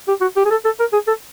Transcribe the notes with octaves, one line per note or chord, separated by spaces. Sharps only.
G4
F#4
G4
G#4
A4
A4
A#4
G#4
A4